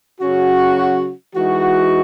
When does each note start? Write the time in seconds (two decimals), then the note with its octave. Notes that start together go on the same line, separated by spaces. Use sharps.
0.21 C#3 F#3 C#4 F#4
1.35 E3 G#3 D#4 F#4